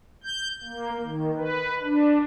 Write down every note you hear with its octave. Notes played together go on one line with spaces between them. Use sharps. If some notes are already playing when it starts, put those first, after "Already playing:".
G6
A#3
D#3
B4
D4